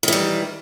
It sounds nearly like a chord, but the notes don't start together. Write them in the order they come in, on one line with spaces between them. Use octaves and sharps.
D#3 E3 G3